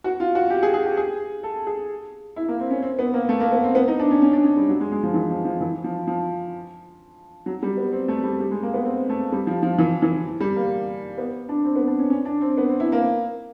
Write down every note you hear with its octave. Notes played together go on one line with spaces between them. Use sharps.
F#4
F4
F#4
G4
G#4
G#4
G4
G#4
A4
G#4
E4
A#3
C4
C#4
C4
B3
A#3
A3
A#3
B3
C4
B3
D#4
D4
C#4
C#4
D4
C#4
G3
F#3
G#3
G#3
F3
E3
F3
F3
E3
F3
F3
F#3
G3
B3
C4
A3
G3
G3
G#3
A#3
B3
C4
A3
G3
F3
F3
E3
E3
G3
A#3
B3
D4
C4
B3
D4
C#4
C#4
D4
C4
B3
C4
E4
A#3